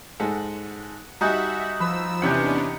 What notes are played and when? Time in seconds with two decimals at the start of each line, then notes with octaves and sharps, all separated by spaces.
0.20 G#2 G#3 A4 F#5
1.21 G3 D#4 F#4 E5 F#5 G#5
1.80 F3 B4 E6
2.22 E2 C3 B3 C#4 D4 G4 F#5